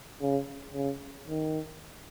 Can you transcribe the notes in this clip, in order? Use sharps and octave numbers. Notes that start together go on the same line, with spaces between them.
C#3
C#3
D#3